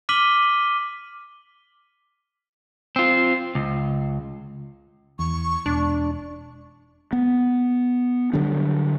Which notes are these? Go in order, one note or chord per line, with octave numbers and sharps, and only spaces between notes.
D6 F6 B6 D#7 F#7 G7
C4 F4
C#2
E2 C#6
E1 D4
B3
D3 F#3 G3 D4